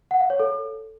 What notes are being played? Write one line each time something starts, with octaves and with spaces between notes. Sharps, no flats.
F#5
F5
C#5
A4